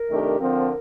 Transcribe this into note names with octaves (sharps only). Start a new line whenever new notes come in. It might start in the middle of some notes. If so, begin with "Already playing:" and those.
Already playing: A#4
C3 D#3 A3 D4 G4
D3 F3 C4 A#4